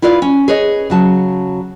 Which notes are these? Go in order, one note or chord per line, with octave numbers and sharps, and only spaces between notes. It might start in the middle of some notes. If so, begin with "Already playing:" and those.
E4 F4 B4 D5 F5
C#4
G#4 B4 C#5 D#5
C#3 F#3 A5